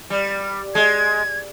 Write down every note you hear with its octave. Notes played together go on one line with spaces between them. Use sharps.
G3
G#3 G#6